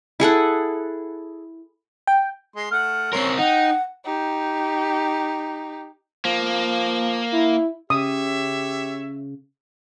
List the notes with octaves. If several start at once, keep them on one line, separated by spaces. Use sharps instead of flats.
E4 G#4 A4 F#5
G5
G#3 C6
A3 F#5 F6
C4 C#4 A#4 C6
D#4 F#5 G5
D#4 G4
F3 A#3
E4
C#3 G4 C#5 E5 D#6